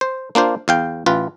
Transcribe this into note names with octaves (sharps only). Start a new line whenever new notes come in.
C5
A#3 D4 F4 C5
E2 F5 G5
A1 F4 B4